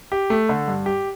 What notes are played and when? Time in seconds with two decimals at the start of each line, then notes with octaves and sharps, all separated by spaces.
0.12 G4
0.30 A3
0.49 D3
0.68 G2
0.86 G4